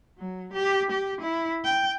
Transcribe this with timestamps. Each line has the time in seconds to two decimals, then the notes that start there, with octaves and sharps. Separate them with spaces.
0.18 F#3
0.53 G4
0.91 G4
1.21 E4
1.64 G5